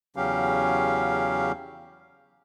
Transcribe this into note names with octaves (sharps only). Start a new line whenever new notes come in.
E2 C#3 F#3 C#4 G4 F5